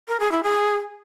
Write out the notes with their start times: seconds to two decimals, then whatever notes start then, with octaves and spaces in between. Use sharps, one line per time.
0.08 A#4
0.20 G#4
0.32 E4
0.43 G#4